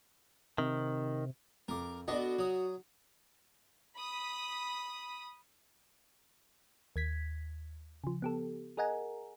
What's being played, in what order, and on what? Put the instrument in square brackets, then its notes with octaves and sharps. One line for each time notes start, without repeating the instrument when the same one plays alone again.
[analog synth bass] C3 [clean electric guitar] D#3
[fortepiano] F2 [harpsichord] A#4 D6
[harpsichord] B3 D4 A4 [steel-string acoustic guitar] F#4 [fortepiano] D5 D#5
[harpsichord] F#3 D#6
[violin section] B5 D#6
[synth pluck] D#2 G#6 B6
C#3 F3
B3 G4 A4
G#4 A#4 D#5 F#5 G#5 A#5